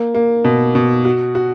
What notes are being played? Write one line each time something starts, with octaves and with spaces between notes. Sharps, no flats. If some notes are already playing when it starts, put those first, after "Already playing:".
Already playing: A#3
A#3
B2
B2
F#4
F#4